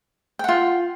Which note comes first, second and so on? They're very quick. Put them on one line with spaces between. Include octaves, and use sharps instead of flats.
G5 F#5 F4